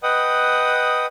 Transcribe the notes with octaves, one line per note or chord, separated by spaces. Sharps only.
B4 D#5 F#5 G5 D#6